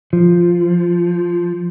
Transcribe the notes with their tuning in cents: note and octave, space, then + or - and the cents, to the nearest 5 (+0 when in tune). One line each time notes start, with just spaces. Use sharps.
F3 -5